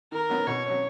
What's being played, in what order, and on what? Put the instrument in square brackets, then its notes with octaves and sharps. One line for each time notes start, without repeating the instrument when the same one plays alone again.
[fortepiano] D#3 [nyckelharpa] A#4
[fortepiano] F#3 B3 D#4
[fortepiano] B2 [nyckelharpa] C#5
[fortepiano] F#3 C#4